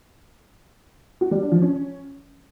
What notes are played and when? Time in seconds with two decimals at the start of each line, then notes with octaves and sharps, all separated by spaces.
1.21 F#4
1.31 G3
1.41 D4
1.52 F3
1.62 C#4